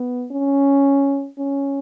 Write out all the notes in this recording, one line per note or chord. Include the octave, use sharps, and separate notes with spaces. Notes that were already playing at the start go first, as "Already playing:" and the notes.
Already playing: B3
C#4
C#4